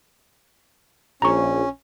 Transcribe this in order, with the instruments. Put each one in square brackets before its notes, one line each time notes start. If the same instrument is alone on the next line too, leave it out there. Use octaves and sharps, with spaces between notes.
[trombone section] A#1 [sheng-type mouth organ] C#4 [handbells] A#5 C#6